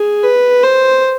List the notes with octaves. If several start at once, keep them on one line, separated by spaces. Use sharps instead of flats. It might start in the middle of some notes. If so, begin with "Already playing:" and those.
Already playing: G#4
B4
C5